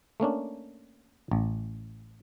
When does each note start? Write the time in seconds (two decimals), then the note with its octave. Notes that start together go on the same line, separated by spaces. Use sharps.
0.20 A3 A#3 C#4 D4
1.31 A1